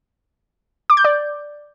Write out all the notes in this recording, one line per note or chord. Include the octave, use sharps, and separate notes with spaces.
D6
G6
D5